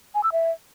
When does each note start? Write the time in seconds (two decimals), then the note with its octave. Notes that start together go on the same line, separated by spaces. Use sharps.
0.15 G#5
0.23 E6
0.32 E5